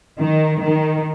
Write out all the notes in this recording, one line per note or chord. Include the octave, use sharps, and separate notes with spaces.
D#3
D#3